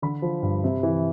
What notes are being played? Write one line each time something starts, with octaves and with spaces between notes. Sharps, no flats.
D3 B5
F3
G2
C3
E3